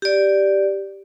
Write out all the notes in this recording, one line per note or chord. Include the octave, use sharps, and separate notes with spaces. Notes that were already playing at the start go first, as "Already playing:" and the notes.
G4 D5